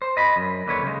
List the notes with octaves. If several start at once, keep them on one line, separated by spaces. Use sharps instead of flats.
C5
D#5 B5
F#2
D#2 D3 B4 C#5
C#3 G#3